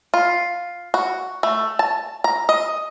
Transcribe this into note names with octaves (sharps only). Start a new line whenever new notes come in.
F4
F#4
A3
A5
A#5
D#5